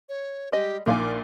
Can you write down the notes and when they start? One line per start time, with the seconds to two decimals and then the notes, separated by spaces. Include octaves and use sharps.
0.09 C#5
0.52 G3 G#3 G4 D#5
0.86 A#1 A#2 A#3 D#4 F5 G#5 D6